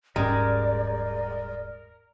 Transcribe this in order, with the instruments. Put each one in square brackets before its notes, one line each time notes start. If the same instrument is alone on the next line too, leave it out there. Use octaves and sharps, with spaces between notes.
[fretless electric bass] D#1 G#2 C#4 [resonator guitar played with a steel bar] G3 G#3 [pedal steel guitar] A#4 [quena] D5